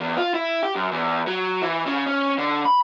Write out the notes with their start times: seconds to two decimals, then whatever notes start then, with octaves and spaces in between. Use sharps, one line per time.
0.01 E2
0.17 F4
0.34 E4
0.63 G4
0.75 F#2
0.92 E2
1.27 F#3
1.62 E3
1.87 C#3
2.06 C#4
2.38 D3
2.65 B5